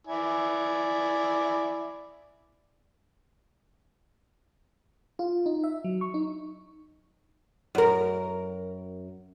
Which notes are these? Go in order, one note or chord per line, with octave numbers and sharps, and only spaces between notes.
E4 D5 G#5
F4
D#4
E5
F#3
C#6
D#4
F#2 A#4